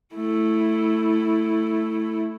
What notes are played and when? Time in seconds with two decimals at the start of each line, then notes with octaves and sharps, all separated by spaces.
0.15 A3 E4